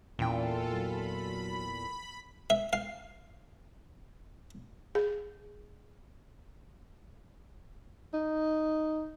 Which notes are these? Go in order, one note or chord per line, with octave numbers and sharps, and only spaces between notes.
E2 A#2 E3 C#4 F4 A4 G5
F#3 B5
E5
F5
G#4
D#4